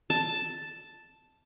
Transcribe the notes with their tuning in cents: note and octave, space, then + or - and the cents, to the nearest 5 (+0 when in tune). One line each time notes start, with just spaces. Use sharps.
A5 +0